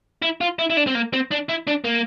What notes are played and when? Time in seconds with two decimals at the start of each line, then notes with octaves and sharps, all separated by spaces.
0.22 E4
0.41 F4
0.59 E4
0.70 E4
0.77 D4
0.87 C4
0.95 A#3
1.13 C4
1.31 D4
1.49 E4
1.67 D4
1.84 A#3